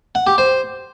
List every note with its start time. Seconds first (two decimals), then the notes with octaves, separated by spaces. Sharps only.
0.15 F#5
0.27 G4
0.38 C5